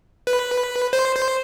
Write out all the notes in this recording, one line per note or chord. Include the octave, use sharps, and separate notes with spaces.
B4
C5
C5